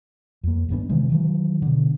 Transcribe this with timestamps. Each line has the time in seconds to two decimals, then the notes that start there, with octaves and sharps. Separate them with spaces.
0.44 F2 A#3
0.69 G#1 G2 B3 D4
0.89 C3 D#3 E3 G#3
1.10 D#3 E3 F#3
1.62 B2 D3